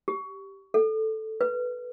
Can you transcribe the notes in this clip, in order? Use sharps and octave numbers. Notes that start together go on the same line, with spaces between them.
G4
A4
B4